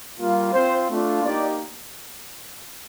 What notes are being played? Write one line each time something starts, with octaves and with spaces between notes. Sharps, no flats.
G3 A#3 F4
C4 F4 C5
A3 D4 F4
A#3 D#4 G4 D5